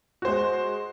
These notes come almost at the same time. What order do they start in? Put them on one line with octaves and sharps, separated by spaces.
F#4 C5 G#3